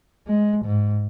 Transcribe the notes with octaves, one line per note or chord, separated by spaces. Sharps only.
G#3
G#2